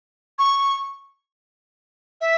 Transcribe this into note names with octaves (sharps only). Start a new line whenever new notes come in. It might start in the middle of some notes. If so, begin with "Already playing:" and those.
C#6
E5